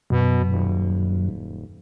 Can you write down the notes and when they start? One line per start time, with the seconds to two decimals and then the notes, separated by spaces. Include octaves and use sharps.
0.10 F#2 B2
0.49 D#1